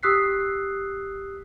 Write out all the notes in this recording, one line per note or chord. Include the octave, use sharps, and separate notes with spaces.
G4 D#6 E6 F#6 B6 C7